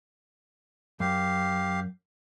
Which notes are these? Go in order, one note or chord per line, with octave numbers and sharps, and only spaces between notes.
F#2 G4 F5